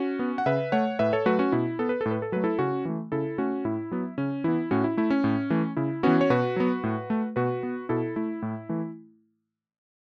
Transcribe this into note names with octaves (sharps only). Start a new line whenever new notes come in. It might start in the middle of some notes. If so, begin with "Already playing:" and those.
Already playing: C#4 F#4
B3
F#5
C#3 B4 E5
A3 C#5 F#5
A2 B4 E5
A4 C#5
F#3 A3 F#4 B4
C#4 F#4
B2 E4
B3 A4
B4
A2 A4
B4
A4
F#3 A3 B4
E4 A4
C#3 C#4 F#4
E3 A3
C#3 E4 A4
A3 C#4 F#4
A2 E4
F#3 B3
C#3 C#4
E3 B3 E4
A2 C#4 F#4
E4
A3 E4
C#4
A2
E3 A3
C#3 E4
E3 B3 C#4 F#4
C#5
B2 F#4 B4
F#3 B3
A2
A3
B2 F#4 B4
B3
B2 E4 A4
A3 E4
A2
E3 A3